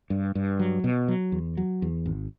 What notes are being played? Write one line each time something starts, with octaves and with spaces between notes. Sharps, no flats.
G2
G2
F#3
B2
F#3
E2
F#3
E2
G#1